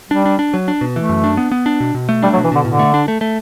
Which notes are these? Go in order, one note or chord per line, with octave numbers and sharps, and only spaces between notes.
G3 D4
D4
D4
F#3
D4
B2
E3 A3
F#2
D4
B3
B3
D4
B2
B2
A3
G3 D4
F#3
B2
E3
B2 D3
A2 D3
A3
D4
A3
A3